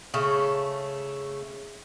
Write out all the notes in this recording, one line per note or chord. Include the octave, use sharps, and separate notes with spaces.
C#3 A3